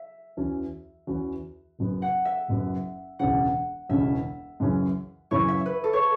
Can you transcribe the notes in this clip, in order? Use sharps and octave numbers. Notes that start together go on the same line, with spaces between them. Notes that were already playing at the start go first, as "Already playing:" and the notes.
Already playing: E5
E2 E3 C#4 F#4
E2 E3 C#4 F#4
F#1 F#2 F#3 B3
F#5
E5
F#1 F#2 F#3 B3
E1 E2 C#3 E3 C#4 F#5
E1 E2 C#3 E3 C#4 E5
F#2 C#3 E3 C#4 E4
F#2 C#3 E3 C#4 E4 C#5
E5
B4
A4
C#5